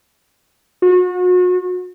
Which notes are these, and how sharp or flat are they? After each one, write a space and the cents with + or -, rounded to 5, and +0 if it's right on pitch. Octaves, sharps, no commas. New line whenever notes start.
F#4 -35